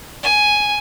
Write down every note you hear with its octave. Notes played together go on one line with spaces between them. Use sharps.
G#5